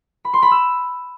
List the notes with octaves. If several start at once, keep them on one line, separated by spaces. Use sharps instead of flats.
B5
C6
B5
E6